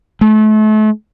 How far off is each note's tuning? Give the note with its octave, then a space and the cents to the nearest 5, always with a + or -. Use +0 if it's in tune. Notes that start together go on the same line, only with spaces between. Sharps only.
A3 -35